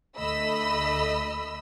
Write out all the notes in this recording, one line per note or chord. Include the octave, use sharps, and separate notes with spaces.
D2 A3 D#5 B5 E6